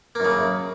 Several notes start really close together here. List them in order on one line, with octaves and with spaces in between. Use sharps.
A#3 F#2 C#3